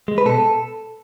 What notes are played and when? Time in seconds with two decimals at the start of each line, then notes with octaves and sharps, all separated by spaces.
0.08 G#3
0.18 B4
0.26 B2 A4